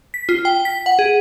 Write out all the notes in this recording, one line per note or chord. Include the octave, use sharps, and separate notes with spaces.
B6
F4
G5
B6
F#5
G#4